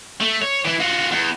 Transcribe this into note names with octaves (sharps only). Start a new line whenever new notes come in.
A3
C#5
E3 E4
F4 F#4
E2